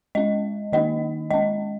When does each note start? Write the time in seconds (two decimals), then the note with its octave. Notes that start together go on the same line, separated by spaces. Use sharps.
0.15 G#3 C#4 D#5
0.73 D#3 A#3 D#4 D#5
1.30 G#3 C#4 D#5